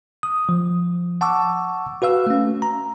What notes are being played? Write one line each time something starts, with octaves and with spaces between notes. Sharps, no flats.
D#6
F3
F#5 A5 C#6 D6 E6
F#4 B4 F5 E6
A3 C#4
A#5